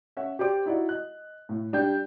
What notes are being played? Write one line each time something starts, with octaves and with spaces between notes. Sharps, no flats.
C#4 E5 F#5
G4 C5 D5 D6
D#4 E4 F#4 D5 F#5
D#5 F#6
A2
G3 D4 G5 G6